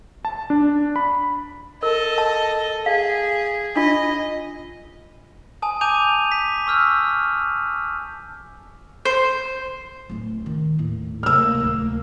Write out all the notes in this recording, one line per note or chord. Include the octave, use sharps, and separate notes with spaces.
A5
D4
B5
A4 A#4 D#5
A5
G#4 F5
D4 F4 D#5
G#5 A5 D#6
G#5 A5 D6 G6 D#7 F7
B6
C#6 E6 F6 G6
C5
D1 C#4
D#3
D#2 A2
D1 C3 A#3 E6 F6
D1 D2